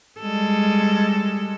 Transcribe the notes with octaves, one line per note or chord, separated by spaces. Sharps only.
G3 G#3 A4